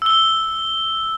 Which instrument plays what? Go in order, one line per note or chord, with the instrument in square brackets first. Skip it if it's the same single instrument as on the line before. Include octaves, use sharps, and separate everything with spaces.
[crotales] E6 G7